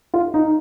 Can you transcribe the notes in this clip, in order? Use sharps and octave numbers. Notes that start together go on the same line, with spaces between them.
F4
D#4